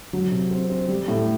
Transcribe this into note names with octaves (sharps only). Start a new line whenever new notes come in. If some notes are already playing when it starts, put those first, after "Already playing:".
F#3
C3
C4
C4
G3
A2